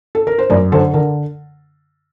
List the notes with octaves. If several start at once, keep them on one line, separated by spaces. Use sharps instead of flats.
A4
A#4
C5
F#2 A#4 D5
D3 A4 C5
D3 A#4